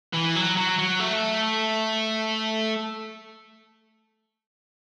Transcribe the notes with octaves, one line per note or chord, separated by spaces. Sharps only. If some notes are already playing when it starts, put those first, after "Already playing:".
E3
F#3
F#3
F#3
A3